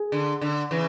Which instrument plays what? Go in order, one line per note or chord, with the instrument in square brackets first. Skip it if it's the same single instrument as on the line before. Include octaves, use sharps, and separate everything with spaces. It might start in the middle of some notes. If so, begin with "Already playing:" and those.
Already playing: [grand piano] G#4
[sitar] D3
D3
C#3 E3